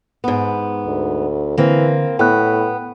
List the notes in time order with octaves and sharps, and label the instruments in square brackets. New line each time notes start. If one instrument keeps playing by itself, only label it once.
[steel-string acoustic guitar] G#2 B3
[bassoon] D2
[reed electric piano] D3 [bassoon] E3 [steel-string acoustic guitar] A#3 C4
[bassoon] A2 [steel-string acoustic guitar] B3 [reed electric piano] G5 F#6